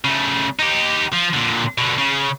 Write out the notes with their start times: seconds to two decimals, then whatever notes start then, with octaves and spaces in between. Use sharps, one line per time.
0.05 C#3 A3
0.59 D#4 G4
1.13 F3
1.34 A#2 D3
1.78 B2 D3
1.98 C#3